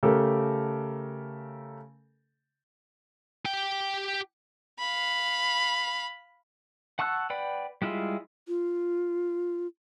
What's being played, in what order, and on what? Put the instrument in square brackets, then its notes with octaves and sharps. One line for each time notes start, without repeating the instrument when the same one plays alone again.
[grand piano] C#3 A3 G4 A4 A#4
[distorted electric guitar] G4 G5
[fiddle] F5 B5
[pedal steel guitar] F#5 A5 C#6 E6 F#6
B4 D5 F#5 G5 B5
G3 G#3 E4 F4 G#4
[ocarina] F4